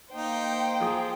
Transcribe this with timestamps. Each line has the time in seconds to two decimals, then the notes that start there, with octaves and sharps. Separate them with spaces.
0.13 A#3 D#4 C5 G5
0.80 F3 G#4 D#6